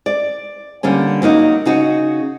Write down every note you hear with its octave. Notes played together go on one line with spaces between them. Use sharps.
D5
D3 G3 A#3 C#4
F#3 A#3 D#4 F#4
C#3 D#4 F#4